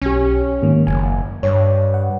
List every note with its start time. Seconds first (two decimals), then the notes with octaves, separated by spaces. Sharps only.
0.02 B1 C#4 G4
0.62 G#2 D#3 A#3
0.87 F#1 G#5
1.43 G2 C#5
1.94 F#5